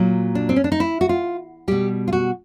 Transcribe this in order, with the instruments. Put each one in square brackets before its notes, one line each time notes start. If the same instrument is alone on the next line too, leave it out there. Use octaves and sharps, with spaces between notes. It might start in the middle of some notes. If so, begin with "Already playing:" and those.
Already playing: [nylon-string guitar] A#2 F#3
D4
C4
C#4
D4
D#4
E4
F#4
F4
B2 G3 G4
F4
F#4